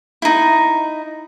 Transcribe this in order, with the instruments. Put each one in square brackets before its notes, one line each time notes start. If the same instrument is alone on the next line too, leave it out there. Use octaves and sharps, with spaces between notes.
[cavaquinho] D#4 E4